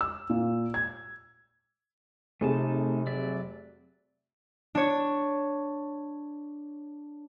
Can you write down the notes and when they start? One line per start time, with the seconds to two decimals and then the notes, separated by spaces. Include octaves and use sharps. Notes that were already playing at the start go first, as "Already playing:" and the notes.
0.01 E6
0.30 A#2
0.74 G#6
2.41 F1 C3 A3 D#4 G#4 A5
3.07 F#3 D5 E5
4.75 D4 C#5